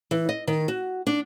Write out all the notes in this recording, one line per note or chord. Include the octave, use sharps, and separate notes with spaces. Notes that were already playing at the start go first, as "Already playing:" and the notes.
E3
D#5
D#3
F#4
D4